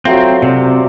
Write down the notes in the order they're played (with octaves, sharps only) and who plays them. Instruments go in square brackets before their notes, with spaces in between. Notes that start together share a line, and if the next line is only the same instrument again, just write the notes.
[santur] F#3 A3 F4 [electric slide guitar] C4
[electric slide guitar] C3 [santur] D5